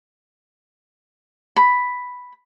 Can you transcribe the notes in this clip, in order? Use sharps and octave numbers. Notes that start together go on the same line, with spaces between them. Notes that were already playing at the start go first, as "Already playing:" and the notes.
B5